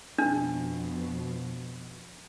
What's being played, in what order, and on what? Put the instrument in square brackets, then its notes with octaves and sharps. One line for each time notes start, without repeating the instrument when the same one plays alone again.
[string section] F2 B2 [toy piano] D4